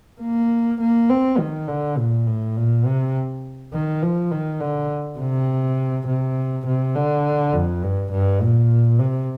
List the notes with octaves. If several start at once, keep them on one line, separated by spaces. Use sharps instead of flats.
A#3
A#3
C4
D#3
D3
A#2
A2
A#2
C3
D#3
F3
D#3
D3
C3
C3
C3
D3
F2
G2
G2
A#2
C3